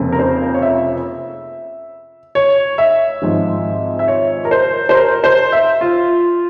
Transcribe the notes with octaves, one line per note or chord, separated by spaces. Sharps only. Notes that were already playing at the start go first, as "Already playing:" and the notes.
Already playing: F1 F2 C#3 F3 A#3
A#4
C5
C#5
E5
C#5
E5
G#1 G#2 F3
E5
C#5
A#4
C5
C5
A#4
C5
E5
F4